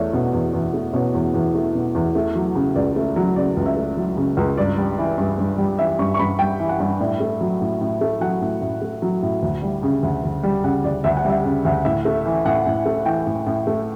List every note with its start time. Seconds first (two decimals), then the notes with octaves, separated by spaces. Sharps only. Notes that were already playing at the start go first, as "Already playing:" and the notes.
Already playing: E2 A3 C#5 D5
0.13 B2
0.33 E2
0.53 E2
0.74 A3
0.93 B2 C#5
1.14 E2
1.34 E2
1.54 A3
1.75 B2
1.95 E2
2.15 A3
2.35 F#3
2.55 C#3
2.75 C#2 D5
2.96 A3
3.16 F#3
3.36 C#3 D5
3.57 C#2
3.66 E5
3.77 A3
3.97 F#3
4.17 C#3
4.37 C#2
4.57 G2 D5
4.78 G3
4.98 E3
5.18 G2
5.38 G2
5.58 G3
5.79 E3 E5
5.99 G2 C#6
6.14 C#6
6.19 G2 B5
6.39 G3 G5
6.59 E3
6.69 F#5
6.80 G2
7.00 A2 D5
7.20 A3
7.40 F#3
7.61 A2
7.81 A2
8.01 A3
8.21 F#3 F#5
8.41 A2
8.61 A2
8.82 A3
9.02 F#3
9.22 A2
9.42 D2
9.62 G3
9.83 C#3
10.03 D2
10.23 D2
10.43 G3
10.64 C#3 F#5
10.84 D2 D5
11.04 D2 E5
11.17 F#5
11.25 G3 E5
11.45 C#3
11.65 D2
11.85 A2 E5
12.05 A3
12.25 E3
12.45 A2 F#5
12.66 A2
12.86 A3
13.06 E3 G5
13.26 A2
13.47 A2
13.67 A3